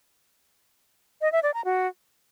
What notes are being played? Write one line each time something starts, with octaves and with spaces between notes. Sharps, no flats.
D#5
E5
D5
A#5
F#4